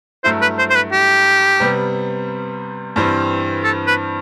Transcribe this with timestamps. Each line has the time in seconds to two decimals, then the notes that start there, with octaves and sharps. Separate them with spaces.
0.24 G2 F#3 A3 E4 C5
0.42 B4
0.58 C5
0.70 C5
0.76 B4
0.92 G4
1.60 C3 G3 B3
2.96 G2 E3 G3 C4
3.64 A4
3.87 B4